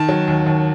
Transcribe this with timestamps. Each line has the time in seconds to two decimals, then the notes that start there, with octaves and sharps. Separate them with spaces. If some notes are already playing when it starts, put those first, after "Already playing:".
Already playing: D#3 A5
0.09 F#3
0.28 D#2
0.46 D#2